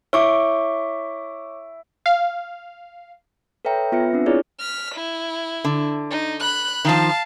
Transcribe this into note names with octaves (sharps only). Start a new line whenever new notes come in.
E4 C#5 C#6 D6
F5
A4 B4 C#5 E5 G5 A#5
B3 F4 B4 E5 A#6 C#7
C4 D4
E4 F4 G#4 C#5 D5
F6 B6
E4
D3
D#4
B5 F#6
D#3 F3 F5 A5